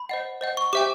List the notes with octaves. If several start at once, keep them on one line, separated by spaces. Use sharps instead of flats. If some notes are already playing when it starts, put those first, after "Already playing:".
Already playing: B5
C5 D#5 F#5
C5 D#5 F#5
C#6
G4 C5 E5 G5 D6